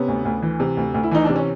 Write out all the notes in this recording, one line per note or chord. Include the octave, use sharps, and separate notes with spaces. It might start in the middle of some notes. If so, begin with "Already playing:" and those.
Already playing: C3 B3 C#4
D2
D2
E3
C3
D2
D2
E4
E3 D#4
C3 D4
C#4